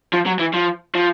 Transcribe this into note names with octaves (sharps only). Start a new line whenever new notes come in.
F3
F#3
E3
F3
F3